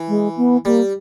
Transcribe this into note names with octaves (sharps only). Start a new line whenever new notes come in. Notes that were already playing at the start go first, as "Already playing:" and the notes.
Already playing: E3
G#3
B3
G3 A#3